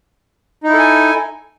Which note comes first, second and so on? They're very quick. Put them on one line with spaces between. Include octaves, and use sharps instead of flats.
D#4 E4 A4 G#5